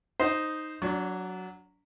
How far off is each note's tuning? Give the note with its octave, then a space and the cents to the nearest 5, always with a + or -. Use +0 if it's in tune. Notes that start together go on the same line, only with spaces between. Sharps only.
D#4 +0 C5 +0 D#5 +0
F#3 +0 D4 -30 D5 +0